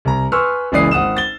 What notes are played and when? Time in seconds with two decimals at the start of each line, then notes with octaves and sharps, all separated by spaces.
0.05 C2 A#5
0.32 B4 G#5 C6 C#6 E6 F6
0.72 F#1 C#2 E3 D5 D#6 C7
0.91 G#1 F#5 D#6 E7
1.17 A6 G7